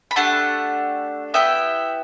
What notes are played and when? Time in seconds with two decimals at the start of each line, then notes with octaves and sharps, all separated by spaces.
0.11 B5
0.16 A3 D4 G4 F#5 A5
1.34 B3 E4 G4 E5 G5